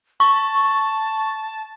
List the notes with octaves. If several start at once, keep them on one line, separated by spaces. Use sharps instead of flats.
A5 C#6